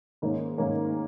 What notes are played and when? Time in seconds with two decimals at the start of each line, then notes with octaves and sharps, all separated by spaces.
0.22 G#2 D#3 A#3 C#4
0.58 G#2 D#3 A#3 C#4